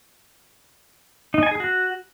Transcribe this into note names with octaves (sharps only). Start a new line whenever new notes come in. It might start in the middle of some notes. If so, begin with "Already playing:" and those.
D#4
G#5
G#4
F#4